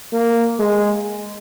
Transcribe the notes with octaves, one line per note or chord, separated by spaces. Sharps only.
A#3
G#3